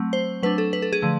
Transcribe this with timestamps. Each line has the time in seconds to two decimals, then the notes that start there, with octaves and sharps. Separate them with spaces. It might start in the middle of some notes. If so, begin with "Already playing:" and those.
Already playing: F#3 A3 C4
0.13 C5
0.43 F#3 A3 D4 B4
0.58 A4
0.73 B4
0.82 A4
0.93 G#4
1.02 D3 F3 A3